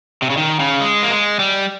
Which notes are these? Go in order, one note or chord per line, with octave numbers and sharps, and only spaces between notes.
C3
C#3
D#3
C#3
G#3
A#3
G#3
G3